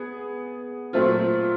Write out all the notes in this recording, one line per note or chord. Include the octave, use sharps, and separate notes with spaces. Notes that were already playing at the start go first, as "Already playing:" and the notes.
Already playing: B3 G#4
A#2 F#3 A3 C4 F4